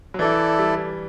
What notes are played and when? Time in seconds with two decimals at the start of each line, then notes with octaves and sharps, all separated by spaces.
0.14 F#3
0.19 E3 E4 A4 D5
0.59 G3